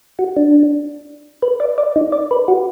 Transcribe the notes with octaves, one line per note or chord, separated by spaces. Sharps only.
F#4
D4
B4
D5
D5
D#4
D5
B4
F#4